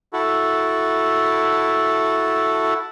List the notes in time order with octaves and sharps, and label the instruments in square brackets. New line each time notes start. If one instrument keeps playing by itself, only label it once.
[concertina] E4 F#4 A4